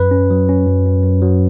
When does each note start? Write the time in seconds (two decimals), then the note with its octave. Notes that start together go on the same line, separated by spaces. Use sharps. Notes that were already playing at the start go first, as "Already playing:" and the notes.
Already playing: F#2 B4
0.11 C#4
0.30 F#3
0.49 C#4
0.67 F#2
0.86 F#2
1.03 F#2
1.22 F#3